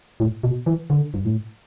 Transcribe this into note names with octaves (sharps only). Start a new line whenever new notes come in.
A2
B2
E3
D3
G2
A2